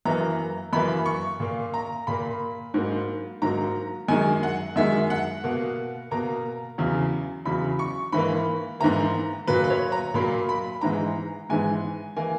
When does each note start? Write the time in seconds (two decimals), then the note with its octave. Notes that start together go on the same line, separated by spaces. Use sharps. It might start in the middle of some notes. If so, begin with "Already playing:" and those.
0.05 F#2 E3 A#3 A#5
0.73 F#2 E3 A#3 B5
1.06 C#6
1.40 A#2 A#3
1.74 A#5
2.07 A#2 A#3 B5
2.74 G#2 F#3 A#3
3.42 G#2 F#3 A#3 A#5
4.08 F#2 D#3 G#3 G#5
4.43 F#5
4.76 F#2 D#3 G#3 E5
5.10 F#5
5.44 B2 A#3
6.11 B2 A#3 A#5
6.78 E2 C#3 F#3
7.45 E2 C#3 F#3 B5
7.79 C#6
8.12 G#2 E3 A#3 B5
8.80 G#2 E3 A#3 A#5
9.47 A#2 F#3 A#3 B4
9.64 B4
9.70 C#5
9.92 A#5
10.14 A#2 F#3 A#3 B5
10.49 B5
10.81 G#2 E3 G#3 A#5
11.49 G#2 E3 G#3 G#5
12.16 E3 A#3 G#5